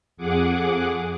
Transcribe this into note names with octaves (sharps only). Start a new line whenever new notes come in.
F2 G#4 F#5 D6